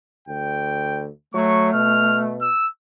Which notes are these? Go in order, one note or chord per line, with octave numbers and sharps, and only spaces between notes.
D2 G5
F#3 A3 C#6
B2 F6
E6